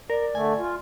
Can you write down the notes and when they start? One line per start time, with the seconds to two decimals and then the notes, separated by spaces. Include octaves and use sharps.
0.10 A#4 D5
0.35 D3 A3 G#5
0.59 F4